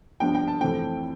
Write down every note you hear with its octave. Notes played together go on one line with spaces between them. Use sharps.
G2 F3 B3 D4 G5
G5
A5
F2 E3 A3 C4 G5